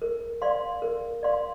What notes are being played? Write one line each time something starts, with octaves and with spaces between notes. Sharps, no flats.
A#4
D5 F5 C6
A#4
D5 F5 C6